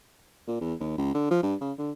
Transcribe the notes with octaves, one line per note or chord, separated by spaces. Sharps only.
A#2
E2
D#2
C#2
D3
F3
G2
C#3
D3